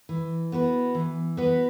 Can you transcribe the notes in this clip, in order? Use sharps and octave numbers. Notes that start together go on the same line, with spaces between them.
E3
B3 F#4 B4
E3
B3 F#4 B4